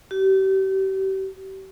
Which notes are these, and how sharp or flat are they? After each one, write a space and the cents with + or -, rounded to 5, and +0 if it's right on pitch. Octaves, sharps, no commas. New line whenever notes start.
G4 -35